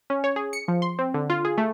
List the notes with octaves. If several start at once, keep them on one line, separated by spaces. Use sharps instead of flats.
C#4
C#5
G#4
C#7
F3
C6
C4
D3
F4
G#4
A3